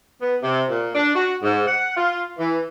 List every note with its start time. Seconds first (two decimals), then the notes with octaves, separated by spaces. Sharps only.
0.21 B3
0.41 C3
0.69 A#2
0.94 D4
1.15 F#4
1.42 G#2
1.66 F#5
1.95 F4
2.38 E3